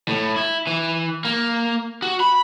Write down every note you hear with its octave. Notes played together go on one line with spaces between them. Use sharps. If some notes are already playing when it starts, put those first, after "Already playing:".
A2
E4
E3
A#3
F#4
B5